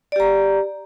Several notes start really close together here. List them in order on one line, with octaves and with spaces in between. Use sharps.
D5 G4 A#5